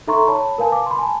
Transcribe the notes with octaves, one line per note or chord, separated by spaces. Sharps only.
D#4 A4 E5 A#5 C6 C#6
C#5 A5 B5
A#4 B4 F5 G#5 A5
D6
B5 C6
G#5 A5